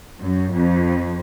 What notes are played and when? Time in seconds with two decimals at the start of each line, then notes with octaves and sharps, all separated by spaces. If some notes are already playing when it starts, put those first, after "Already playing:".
0.20 F#2
0.55 F2